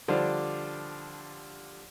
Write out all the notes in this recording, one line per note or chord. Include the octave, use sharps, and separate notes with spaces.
D3 F3 G3 D4